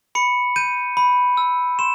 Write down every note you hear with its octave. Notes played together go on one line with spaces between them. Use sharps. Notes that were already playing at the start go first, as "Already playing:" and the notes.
B5 C#7
G6 D#7
B5
E6
C6 E7